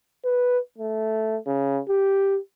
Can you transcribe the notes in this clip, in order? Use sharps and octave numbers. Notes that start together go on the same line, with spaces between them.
B4
A3
C#3
G4